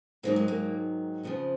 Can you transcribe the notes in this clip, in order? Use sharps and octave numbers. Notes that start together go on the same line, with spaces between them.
G#2 D#3 F#3 A#3
G#3
A#3
F2 C#3 F3 B3